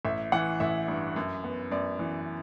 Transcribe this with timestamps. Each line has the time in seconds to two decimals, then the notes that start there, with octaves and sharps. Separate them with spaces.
0.05 A1 E5
0.32 E3 F#5
0.60 A1 E5
0.88 G2
1.16 F#2
1.44 B3
1.71 F#2 D5
1.99 E3